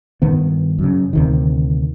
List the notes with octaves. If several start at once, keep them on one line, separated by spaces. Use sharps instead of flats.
G2 D#3 B3
F#2 C#3
D2 C3 D#3